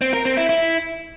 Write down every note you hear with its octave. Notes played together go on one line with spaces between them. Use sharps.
C4
A#4
C4
E4
E4